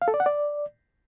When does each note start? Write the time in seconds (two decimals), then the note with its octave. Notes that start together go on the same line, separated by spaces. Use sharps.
0.02 F5
0.08 A4
0.14 D5
0.20 F#5
0.26 D5